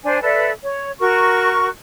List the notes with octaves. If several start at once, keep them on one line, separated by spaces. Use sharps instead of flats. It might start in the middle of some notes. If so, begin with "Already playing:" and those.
D4 C5 G#5
A4 B4 D5 E5
C#5
F#4 A#4 C#6